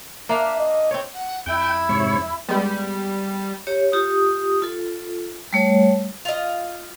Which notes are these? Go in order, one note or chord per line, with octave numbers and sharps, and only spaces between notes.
A#3 D4 E5 F5
D#5
C4 C#5
F#5
F2 E4 G5
G#2 C3 C#5
G2 G3 G#3 B3
G4 C#5
F4 G4 D#6
F4 A4
G3 A3 C#5
F4 D#5